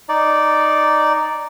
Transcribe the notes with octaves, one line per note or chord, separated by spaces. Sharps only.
D#4 D5